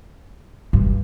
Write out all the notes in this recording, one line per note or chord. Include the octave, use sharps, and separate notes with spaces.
G2